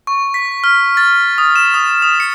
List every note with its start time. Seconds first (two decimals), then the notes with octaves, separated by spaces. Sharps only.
0.07 C#6
0.34 B6
0.64 F6
0.97 A6
1.38 D#6
1.56 E7
1.74 D#6
2.02 D#6
2.20 C#7